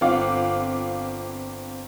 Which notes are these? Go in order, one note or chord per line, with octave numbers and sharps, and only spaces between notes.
G1 C4 F4 F5 F#5 D6